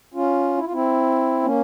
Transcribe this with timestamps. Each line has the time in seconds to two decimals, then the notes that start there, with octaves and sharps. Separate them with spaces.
0.14 C#4 F4
0.57 E4
0.65 F4
0.72 C4 E4
1.43 A#3 C#4